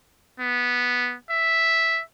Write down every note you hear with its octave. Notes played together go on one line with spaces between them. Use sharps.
B3
E5